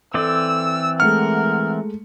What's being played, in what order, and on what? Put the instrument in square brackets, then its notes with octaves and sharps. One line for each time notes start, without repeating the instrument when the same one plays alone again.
[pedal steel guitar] E3 C4 D5 [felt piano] A4 [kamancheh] E6
[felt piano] G#3 A3 C#7 [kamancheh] A#4 F#5 [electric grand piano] F6